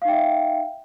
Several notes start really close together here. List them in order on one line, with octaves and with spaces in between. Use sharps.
F5 D#4 G5 E5